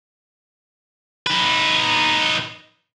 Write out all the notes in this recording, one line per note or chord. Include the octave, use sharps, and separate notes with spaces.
D#4 B4